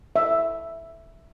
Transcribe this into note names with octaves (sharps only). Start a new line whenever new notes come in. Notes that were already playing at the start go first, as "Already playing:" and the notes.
E5